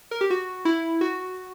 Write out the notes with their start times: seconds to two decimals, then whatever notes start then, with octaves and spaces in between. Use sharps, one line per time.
0.11 A#4
0.21 G4
0.30 F#4
0.65 E4
1.01 F#4